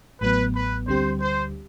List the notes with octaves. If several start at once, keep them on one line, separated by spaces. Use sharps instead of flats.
A1 A2 F#3 B3 B4
B4
D2 D3 G3 C4 G4 C5
C5